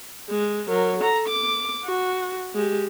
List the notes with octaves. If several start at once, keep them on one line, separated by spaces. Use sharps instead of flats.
G#3
F#3 A#4
A4 A#5
D6
F#4
G#3 G4